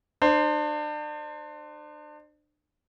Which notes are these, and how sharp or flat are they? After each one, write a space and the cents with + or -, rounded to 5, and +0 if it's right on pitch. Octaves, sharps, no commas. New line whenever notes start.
D4 +35 C5 +0